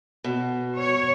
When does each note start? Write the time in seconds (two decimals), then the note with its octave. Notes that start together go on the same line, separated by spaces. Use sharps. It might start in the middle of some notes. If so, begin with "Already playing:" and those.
0.24 B2
0.77 C#5